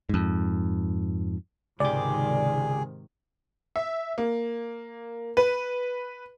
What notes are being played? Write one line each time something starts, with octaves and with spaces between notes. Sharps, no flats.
F2 G#2
C#2 G#2 C3 D#3 G4 G#4 D5
E5
A#3
B4